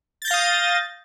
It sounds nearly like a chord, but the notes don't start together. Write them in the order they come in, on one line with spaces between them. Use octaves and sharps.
A6 G6 A#6 F5 D#6